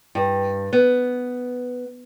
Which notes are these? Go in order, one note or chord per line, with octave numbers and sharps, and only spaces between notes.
G2
B3